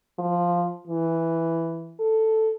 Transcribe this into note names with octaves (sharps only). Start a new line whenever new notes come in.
F3
E3
A4